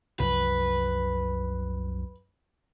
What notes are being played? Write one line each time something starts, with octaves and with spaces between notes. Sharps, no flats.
C2 F#2 F3 B4